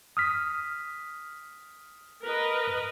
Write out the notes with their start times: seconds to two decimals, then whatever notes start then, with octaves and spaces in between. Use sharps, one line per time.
0.17 D#6 F6 B6
2.24 A#4 B4 D#5